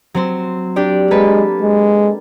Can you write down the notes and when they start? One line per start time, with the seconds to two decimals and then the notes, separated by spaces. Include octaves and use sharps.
0.14 F#3 C4 C5
0.76 D4 G4 D5
1.11 G#3 A#3 A4 B4
1.62 G#3